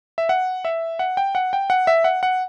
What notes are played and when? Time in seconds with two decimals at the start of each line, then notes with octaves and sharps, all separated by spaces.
0.18 E5
0.29 F#5
0.65 E5
0.99 F#5
1.17 G5
1.35 F#5
1.53 G5
1.70 F#5
1.87 E5
2.04 F#5
2.23 F#5